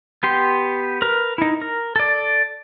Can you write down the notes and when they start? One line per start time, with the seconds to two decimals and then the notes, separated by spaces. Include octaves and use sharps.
0.23 B3 G4 C6
1.02 A#4 B4
1.38 D#4 E4
1.62 A#4
1.96 A4 D5